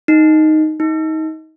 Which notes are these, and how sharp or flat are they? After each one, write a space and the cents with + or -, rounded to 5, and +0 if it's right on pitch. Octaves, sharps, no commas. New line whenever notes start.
D#4 +0
D#4 +25